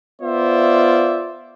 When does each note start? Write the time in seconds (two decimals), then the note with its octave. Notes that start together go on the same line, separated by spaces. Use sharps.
0.22 B3 F4 C5 D5 E5